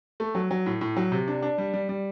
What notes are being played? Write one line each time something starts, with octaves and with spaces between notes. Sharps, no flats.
A3
F#3
F#3
A2
A2
F#3
C3
D4
D4
G3
G3
G3